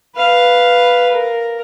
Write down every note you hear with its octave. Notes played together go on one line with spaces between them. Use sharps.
B4 F5
A#4